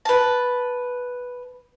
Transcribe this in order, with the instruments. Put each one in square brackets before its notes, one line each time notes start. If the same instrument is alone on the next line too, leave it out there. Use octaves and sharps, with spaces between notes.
[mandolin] B4 A5